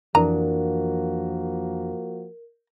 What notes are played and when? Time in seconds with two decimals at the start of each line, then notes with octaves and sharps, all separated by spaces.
0.15 F2 E3 F3 A#3 D4 F#4 A#4 A#5